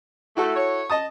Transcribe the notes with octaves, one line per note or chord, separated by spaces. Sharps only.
A3 E4 F#4 A4
C#5
D#5 A5 D#6